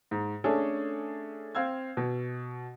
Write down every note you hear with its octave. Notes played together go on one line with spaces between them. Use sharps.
G#2
A3 C#4 D4 G#4 A4
C4 F5 E6 G#6
B2